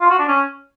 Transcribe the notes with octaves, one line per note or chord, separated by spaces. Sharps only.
F4
F#4
D4
C#4